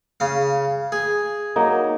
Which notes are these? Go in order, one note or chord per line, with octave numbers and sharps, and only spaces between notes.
C#3 F5
G#4
F#3 A#3 D#4